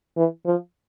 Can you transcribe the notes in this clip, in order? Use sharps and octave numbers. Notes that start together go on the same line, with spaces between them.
E3
F3